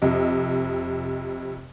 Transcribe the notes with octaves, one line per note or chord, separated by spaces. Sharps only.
F2 C3 D#5